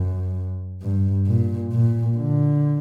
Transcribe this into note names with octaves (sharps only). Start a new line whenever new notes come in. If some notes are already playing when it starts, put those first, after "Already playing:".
Already playing: F#2
G2
A#2
A#2
D3